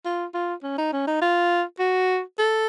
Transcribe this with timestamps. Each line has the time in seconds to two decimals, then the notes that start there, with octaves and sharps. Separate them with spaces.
0.05 F4
0.34 F4
0.63 C#4
0.78 D#4
0.93 C#4
1.07 D#4
1.22 F4
1.80 F#4
2.39 A4